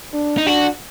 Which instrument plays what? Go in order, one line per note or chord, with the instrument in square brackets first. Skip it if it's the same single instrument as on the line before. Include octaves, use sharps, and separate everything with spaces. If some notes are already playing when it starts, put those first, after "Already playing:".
[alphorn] D4
[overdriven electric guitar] D#4
[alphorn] D4 [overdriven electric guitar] F#4